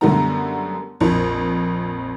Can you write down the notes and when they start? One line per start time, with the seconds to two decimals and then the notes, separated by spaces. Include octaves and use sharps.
0.01 F#2 D3 G3 A3 B3 A#5
1.01 A#1 F2